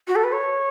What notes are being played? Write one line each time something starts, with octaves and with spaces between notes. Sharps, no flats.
F#4
A4
B4
C#5